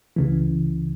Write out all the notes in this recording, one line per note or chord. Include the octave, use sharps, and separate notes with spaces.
C#2 C#3 E3